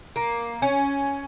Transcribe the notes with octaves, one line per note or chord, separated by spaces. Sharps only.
A#3
C#4